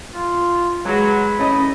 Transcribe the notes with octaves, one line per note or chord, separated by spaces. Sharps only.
F4
F#3 G#3 B4
A3 C#4 E4 D#5